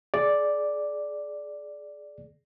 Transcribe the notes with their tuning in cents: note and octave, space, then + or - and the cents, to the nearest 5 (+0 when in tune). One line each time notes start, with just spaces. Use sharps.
G#4 +25 D5 +0